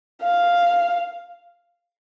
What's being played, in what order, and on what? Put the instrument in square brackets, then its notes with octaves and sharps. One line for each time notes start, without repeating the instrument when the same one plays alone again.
[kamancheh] F5